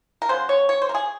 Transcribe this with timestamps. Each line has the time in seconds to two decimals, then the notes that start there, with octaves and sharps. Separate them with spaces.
0.22 A#4
0.29 C#3 F#3 C5
0.49 C#5
0.69 C#5
0.82 C5
0.89 A#4
0.95 G#4